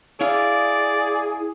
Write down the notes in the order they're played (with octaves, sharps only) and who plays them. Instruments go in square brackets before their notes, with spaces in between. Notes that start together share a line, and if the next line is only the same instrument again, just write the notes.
[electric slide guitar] E4 F5 [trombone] G#4 [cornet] D5